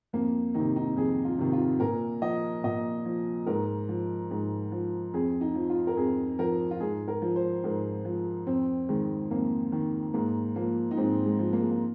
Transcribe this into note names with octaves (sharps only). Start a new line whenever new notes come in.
F2 A#3
C3 D#3 D#4
D#4
F2 G#4
F4
C3 D#3
F4
A#2 A#4
F3 D#5
A#2 D#5
F3
G#2 A#4
F3
G#2
F3
F2 G#4
D#4
F3
F4
A#4
F2 G#4
F3 A#4
F4
G#2 G#4
A#4
F3
C5
G#2 A#4
F3
F2 C4
D#3 G#3
F2 A#3
D#3
G#2 A#3
F3 A#3
D#4
G#2 C4
G#3
F3
A#3
G#3
A#3